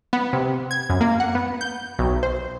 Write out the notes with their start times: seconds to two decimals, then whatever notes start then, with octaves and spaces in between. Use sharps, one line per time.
0.13 B3
0.33 C3
0.71 G#6
0.89 F#2
1.01 A#3
1.20 F#5
1.35 B3
1.61 G6
1.99 B1
2.23 C5